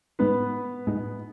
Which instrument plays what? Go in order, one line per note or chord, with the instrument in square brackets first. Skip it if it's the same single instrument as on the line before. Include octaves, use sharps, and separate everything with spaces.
[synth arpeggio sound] A2 G#3 D#4 [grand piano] B3 B4
[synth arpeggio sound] A2 G#3 D#4